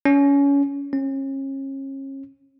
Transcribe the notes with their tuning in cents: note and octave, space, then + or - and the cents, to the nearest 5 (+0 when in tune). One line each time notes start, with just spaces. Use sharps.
C#4 +25
C#4 -35